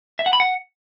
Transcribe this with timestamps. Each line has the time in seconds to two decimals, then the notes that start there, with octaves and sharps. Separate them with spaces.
0.19 E5
0.26 F#5
0.33 B5
0.40 F#5